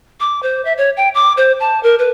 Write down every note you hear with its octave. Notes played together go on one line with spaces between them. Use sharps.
D6
C5
E5
C#5
G5
D6
C5
A5
A#4
B4